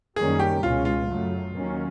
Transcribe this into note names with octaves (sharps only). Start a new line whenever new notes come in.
F#2 D#3 G3 A#3 C#4 G#4
G4
C#2 B2 G#3 C#4 F4
F4
F#2 C#3 F#3 A3
D#2 D#3 F#3 A#3 C#4